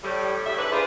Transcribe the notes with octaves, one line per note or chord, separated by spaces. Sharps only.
A2 G3
A2 C#3 G3 E5
G#2 D4 B4
D4 E4 F4 G#4 C5